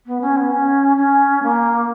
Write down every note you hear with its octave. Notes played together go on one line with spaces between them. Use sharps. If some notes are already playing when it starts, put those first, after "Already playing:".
B3
C#4
B3
C#4
C#4
A#3